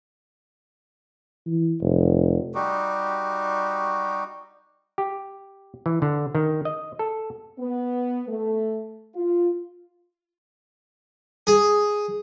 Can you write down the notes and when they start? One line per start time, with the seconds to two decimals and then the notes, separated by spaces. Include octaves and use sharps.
1.46 E3
1.81 F1
2.55 G3 D#4 F#4 G4
4.98 G4
5.86 E3
6.02 D3
6.35 D#3
6.65 D#5
6.99 A4
7.59 B3
8.28 A3
9.15 F4
11.47 G#4